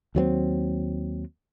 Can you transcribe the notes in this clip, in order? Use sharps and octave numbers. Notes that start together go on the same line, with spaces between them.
D#2 F#3 B3 C4